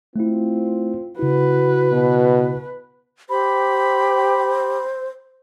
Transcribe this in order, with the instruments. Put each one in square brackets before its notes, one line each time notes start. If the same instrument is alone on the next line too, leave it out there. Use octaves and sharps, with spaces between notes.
[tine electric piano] A3 E4 [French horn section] C4 F4
[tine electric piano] C#3 E4 [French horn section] F#4 [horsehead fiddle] B4
[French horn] B2
[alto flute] G4 [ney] C5 [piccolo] B5